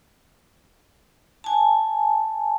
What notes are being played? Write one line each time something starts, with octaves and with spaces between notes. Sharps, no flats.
G#5 A5